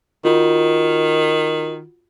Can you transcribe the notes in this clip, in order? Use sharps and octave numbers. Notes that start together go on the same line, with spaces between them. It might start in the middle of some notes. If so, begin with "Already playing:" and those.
D#3 F4 F#4